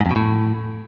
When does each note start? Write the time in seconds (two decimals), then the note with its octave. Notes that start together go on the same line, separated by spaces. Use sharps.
0.01 G#2
0.06 F2
0.11 B2
0.16 A2